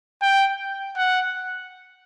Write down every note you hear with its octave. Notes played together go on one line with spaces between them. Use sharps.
G5
F#5